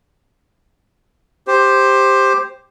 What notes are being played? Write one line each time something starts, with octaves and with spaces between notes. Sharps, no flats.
G4 C5